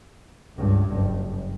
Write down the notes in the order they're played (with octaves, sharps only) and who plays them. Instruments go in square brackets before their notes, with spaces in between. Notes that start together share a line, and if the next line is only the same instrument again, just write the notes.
[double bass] C#2 G2
F#1